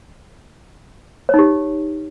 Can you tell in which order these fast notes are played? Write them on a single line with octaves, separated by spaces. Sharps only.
C#5 D#4 G4